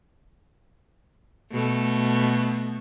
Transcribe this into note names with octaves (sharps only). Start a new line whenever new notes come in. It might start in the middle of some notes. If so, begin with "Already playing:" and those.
B2 A3